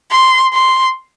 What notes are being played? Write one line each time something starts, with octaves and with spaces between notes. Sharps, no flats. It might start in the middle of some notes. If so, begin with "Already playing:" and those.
C6
C6